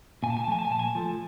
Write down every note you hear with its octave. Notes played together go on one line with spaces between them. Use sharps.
A#2 G#5
A5
G#5
A5
F3 A3 G#5
A5
G#5
A#2 A5
G#5
F3 A3